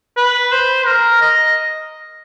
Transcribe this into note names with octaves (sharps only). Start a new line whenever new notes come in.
B4
C5
A#4
D#5